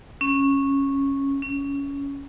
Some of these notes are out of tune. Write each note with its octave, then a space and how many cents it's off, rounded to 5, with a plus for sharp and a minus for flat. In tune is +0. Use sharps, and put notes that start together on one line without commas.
C#4 -10
C#4 +15